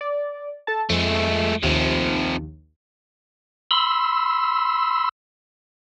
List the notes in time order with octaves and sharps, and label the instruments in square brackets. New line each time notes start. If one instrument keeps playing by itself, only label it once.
[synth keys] D5
A4 A5
[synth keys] F2 [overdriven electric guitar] G#3 A3
[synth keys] A#1 D#2 [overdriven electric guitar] C3 F3
[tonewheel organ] B5 C6 E6